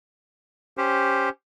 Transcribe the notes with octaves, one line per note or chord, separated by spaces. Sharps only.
C#4 G4 C5